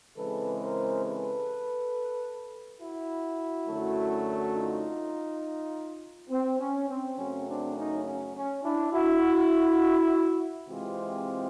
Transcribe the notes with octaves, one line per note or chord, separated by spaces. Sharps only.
C#3 E3 G#3 C4 A4 B4
A#4 C5
A4 B4
E4 F#4
F#2 D3 F#3 A3
D#4 F4
C4
C#4
C4
F#2 C#3 F#3 A3 C4 C#4
C4 D4
C#4 D#4
C#4
C#4
D4 E4
E4 F#4
C3 E3 G#3 C4 F4 G4